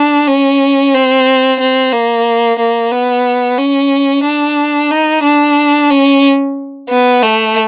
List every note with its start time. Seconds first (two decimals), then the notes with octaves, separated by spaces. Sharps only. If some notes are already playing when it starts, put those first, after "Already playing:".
Already playing: D4
0.28 C#4
0.94 C4
1.60 C4
1.93 A#3
2.59 A#3
2.92 B3
3.58 C#4
4.24 D4
4.91 D#4
5.24 D4
5.90 C#4
6.89 B3
7.22 A3